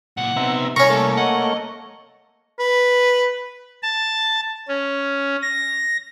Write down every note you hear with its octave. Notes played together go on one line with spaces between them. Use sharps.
C#2 A#2 F#5
C3 B3 D#4 E5 A#5
C2 C#4 A#4 A#5 C#6
A3 A#3 A4 C#5
D#5 F#5
B4
A5
C#4
A#6